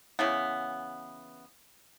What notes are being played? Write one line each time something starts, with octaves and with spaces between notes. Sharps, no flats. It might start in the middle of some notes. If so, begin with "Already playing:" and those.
C#3 E3 B3